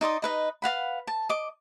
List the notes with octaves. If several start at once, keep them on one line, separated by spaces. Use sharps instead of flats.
D#4 D5 C6 D#6
D#4 B4 D#5
B4 F5 F#5 B5
A5
D#5 D6